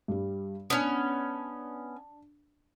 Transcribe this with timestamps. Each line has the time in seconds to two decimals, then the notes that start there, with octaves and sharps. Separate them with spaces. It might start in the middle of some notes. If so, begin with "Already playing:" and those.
0.08 G2 G3
0.70 B3 C#4 D4